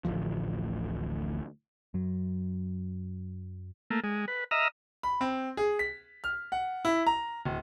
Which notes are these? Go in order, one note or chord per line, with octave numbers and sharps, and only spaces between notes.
D1 A1 D2 F3
F#2 F#3
A3 A#3
G#3
B4
D#5 E5 A#5 F6
B5
C4
G#4
B6
F6
F#5
E4
A#5
D1